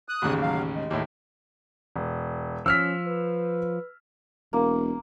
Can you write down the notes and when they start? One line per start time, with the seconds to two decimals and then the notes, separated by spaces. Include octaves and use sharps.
0.08 D#6 F#6
0.22 A1 D#2 C#3
0.42 F#3 F5
0.74 G#3
0.91 D#2 A2
1.96 E1
2.66 F3 C#4 E6 F6 B6
3.07 B4
4.53 E1 A#3